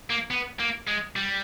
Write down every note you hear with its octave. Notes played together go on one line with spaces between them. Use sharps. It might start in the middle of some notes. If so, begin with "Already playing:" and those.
A#3
B3
A#3
G#3
G3